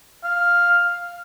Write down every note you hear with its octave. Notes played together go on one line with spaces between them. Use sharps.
F5